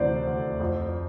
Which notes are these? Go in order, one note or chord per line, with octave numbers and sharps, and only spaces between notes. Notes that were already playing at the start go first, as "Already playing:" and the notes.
Already playing: D2 C3 E3 C5 D5
D2
F2 C5